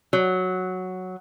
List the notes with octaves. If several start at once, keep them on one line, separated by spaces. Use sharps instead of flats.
F#3